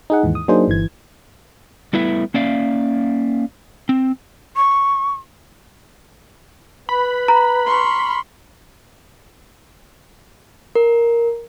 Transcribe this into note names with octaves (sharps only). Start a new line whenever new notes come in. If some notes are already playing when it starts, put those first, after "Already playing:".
D#4 G#4 F#5
D#2 G#2 E3
D#6
F#3 A#3 D4 D#4 G#4 C5
G1 E3 G#6
G3 A3 B3 E4 B4 E5
A#3 C#4 D5 E5 F5
C4
C#6
B4 B5
A#5
C6 C#6 F6
A#4